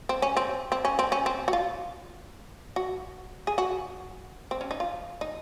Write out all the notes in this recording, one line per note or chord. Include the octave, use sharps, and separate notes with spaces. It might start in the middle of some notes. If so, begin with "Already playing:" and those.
C4
C#4
C4
C4
C#4
C4
C#4
C4
F#4
F4
F#4
G#4
F#4
C4
C#4
D#4
F4
D#4